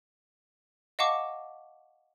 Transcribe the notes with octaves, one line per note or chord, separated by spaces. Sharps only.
D#5 F5 F#5 A5 C#6 D6